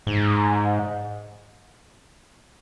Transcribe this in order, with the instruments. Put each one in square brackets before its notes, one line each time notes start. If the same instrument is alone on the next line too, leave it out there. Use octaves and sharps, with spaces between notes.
[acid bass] G#2